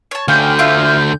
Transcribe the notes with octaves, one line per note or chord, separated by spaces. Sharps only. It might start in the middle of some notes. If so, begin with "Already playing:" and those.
C#5 A5
D2 D3 C#4 F5 G5 G6
E4 F4 F5